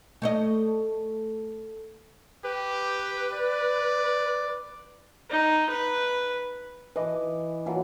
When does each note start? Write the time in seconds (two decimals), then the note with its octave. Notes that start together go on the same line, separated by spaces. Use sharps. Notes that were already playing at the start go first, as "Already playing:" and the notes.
0.22 A3 C#5 D#5
2.44 G4 B4
3.33 D5
5.30 D#4
5.69 B4
6.96 E3 B4 D#5 D6
7.66 A#2 E3 F#3